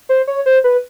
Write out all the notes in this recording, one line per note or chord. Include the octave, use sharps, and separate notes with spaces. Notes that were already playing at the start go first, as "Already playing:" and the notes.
C5
C#5
C5
B4